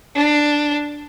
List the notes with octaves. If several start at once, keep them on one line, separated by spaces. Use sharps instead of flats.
D4